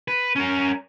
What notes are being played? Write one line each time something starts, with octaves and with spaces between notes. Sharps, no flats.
B4
C#4 A#4